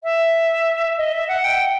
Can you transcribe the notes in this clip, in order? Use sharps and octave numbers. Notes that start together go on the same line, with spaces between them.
E5
D#5
E5
F#5
G5